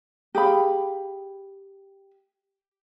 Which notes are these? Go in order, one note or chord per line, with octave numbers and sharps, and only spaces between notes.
G4 G#4 F5 B5